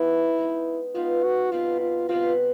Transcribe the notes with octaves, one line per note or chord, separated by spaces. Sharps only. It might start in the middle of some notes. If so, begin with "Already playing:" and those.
Already playing: G3 B3 D#4 E4 G#4
G#3 B3 D#4
G#3 B3 D#4 F4
F#4
B2 G3 C4 F4
F4
B2 G3 C4 F4